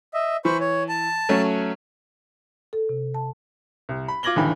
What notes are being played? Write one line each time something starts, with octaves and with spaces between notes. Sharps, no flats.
D#5 E5
E3 C5 B5 C#6
C#5
A5
F#3 A3 C#4
A4
C3
A5
C2
B5
F4 D6 G#6 A#6 F#7 G7
A1 D#2 D3 E3 B5